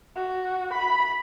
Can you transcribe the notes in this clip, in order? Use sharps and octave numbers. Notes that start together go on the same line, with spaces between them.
F#4
B5